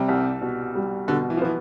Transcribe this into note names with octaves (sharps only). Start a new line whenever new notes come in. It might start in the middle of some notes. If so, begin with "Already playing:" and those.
Already playing: C3 G3
C2
B2
G3
B2 D3
E3
F3
E3 B3